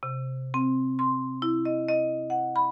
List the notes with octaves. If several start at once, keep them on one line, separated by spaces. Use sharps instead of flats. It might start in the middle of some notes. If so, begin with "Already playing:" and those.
C3
C4
C6
E4
D#5
D#5
F#5
B5